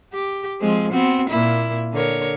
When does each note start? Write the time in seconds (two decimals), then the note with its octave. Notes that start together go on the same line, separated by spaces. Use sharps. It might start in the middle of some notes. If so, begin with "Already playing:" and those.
0.14 G4
0.61 F3 G#3 C4
0.91 B3 C4 F#4
1.29 A#2 A#3 E4
1.93 D3 A#4 C#5